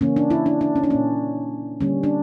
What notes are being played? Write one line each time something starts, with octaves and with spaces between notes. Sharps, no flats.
C#3 E3 A#3 C#4
D4
E4
D4
D4
C#4
D4
A#2 A#3 C#4
D3 G3 A#3 C#4
D4